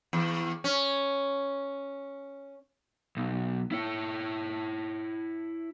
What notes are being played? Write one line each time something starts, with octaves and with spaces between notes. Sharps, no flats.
E2
C#4
B1
E4 C#5